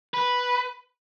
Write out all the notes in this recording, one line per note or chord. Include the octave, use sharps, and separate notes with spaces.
B4